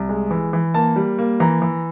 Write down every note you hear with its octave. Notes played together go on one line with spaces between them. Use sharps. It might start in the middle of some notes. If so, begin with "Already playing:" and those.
Already playing: C2
G#3
E3
E3
A#3 A5
G3
A#3
E3 A#5
E3